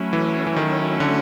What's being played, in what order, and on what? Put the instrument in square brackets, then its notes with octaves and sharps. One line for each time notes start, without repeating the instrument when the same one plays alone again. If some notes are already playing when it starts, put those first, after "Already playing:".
Already playing: [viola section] F#3 A3 C#4 E4
[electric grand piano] E3
E3
D#3
D3